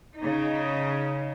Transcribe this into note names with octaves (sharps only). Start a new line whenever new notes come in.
C#3 D#4